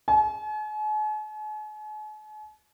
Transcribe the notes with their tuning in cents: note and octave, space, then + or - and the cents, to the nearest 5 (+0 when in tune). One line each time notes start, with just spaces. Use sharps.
G#5 +45